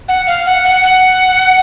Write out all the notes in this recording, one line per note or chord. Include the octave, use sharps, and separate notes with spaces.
F#5
F5
F#5
F#5
F#5